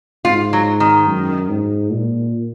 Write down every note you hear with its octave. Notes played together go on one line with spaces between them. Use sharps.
G#2 F4
F#3
D#3
F#2
G#2
A#2